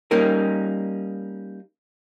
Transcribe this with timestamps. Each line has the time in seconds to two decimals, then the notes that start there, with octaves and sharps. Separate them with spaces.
0.11 G3 A#3 C#4 D#4 A#4